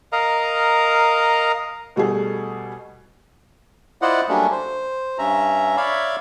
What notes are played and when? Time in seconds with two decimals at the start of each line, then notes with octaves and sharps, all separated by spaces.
0.12 A#4 D#5 F5 A#5
1.96 B2 G3 A3 G#4
4.02 E4 F4 C5 D5 D#5 F#5
4.29 F#3 G3 A3 A#3 C#4 D4
4.51 C5
5.18 G2 C#4 E5 A#5
5.77 C#5 D5 E5 F5 B5